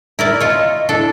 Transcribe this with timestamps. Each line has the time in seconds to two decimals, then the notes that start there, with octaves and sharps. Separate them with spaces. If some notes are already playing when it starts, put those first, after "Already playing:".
0.19 E4 A#4 D5
0.40 F4 C#5 D#5
0.89 D4 E4 A4